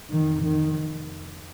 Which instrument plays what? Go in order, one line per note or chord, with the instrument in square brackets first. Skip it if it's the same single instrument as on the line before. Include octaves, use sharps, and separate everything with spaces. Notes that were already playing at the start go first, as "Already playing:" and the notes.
[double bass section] F1 F2 D#3
D#3